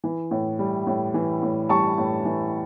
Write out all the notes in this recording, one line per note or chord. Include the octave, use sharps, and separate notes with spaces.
E3
A2
G3
A2
E3
A2
G3 A5 C#6
A2
E3